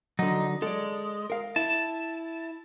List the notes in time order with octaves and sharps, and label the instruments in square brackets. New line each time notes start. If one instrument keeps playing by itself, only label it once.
[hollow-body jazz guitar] D3 F#3 [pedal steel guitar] D#4
[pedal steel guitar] G#3 [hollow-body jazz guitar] A4 D5
[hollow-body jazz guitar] A#4 F5
[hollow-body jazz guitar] E4 [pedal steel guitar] A5